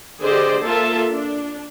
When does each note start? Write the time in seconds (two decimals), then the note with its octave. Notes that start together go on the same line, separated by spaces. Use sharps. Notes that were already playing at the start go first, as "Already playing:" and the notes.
0.23 D3 G4 G#4 C5 D5 D#5
0.65 A#3 F4 A4 E5 A5
1.12 D4